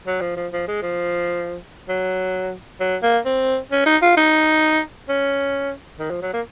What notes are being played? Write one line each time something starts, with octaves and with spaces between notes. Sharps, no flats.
F#3
F3
F3
F3
G#3
F3
F#3
F#3
A#3
C4
C#4
D#4
F4
D#4
C#4
D#3
F3
F#3
A#3